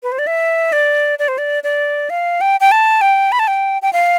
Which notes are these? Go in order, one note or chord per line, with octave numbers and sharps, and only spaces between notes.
B4
C5
D5
E5
D5
D5
C5
D5
D5
F5
G5
G5
A5
G5
B5
A5
G5
G5
F5